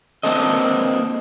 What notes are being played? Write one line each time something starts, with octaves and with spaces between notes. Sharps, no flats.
A#3 C4 D4 A4 D#5